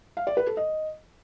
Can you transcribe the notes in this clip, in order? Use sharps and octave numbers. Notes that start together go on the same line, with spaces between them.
F5
D5
B4
A4
D#5